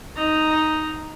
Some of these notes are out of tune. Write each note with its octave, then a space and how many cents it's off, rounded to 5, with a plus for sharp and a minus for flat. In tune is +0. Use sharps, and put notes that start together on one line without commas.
D#4 +0 A#5 +0